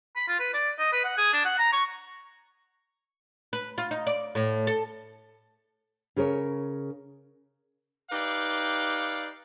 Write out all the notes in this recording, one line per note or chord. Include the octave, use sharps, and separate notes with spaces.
B5
F4
B4
D5
D#5
B4
F#5
G#4
D4
F#5
A#5
C#6
B4
F4
D#4
D5
A2
A4
C#3 G#4 A#4 C#5
D#4 G4 B4 D5 F5